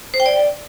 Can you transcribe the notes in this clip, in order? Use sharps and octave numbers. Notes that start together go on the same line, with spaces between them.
C5
G5
D5